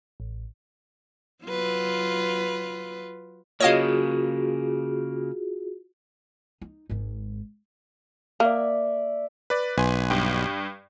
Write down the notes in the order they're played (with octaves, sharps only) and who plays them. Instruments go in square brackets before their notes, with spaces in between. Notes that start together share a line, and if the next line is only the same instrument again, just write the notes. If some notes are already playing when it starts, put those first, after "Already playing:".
[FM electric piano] A1
[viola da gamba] F#3 F4 B4
[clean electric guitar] C#3 A#3 [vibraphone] F4 F#4 G#4 [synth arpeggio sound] C#5 D#5 F5
[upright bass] D#4
G#1 G#2
[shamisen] A#3 [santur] D5 E5
[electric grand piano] B4 D5
[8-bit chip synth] B1 [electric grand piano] B4 G#5 C6
[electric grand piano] G2 G5